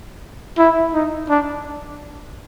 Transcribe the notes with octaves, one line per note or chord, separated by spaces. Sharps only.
E4
D#4
D4